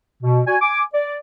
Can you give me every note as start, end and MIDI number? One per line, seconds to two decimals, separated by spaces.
0.23 0.41 47
0.46 0.56 66
0.46 0.56 74
0.46 0.56 80
0.62 0.82 80
0.62 0.82 86
0.94 1.16 74